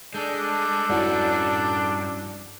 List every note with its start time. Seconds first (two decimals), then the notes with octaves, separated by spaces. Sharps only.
0.14 G#3 D4 A4 G6
0.90 G2 C#4 E4 F#4 D5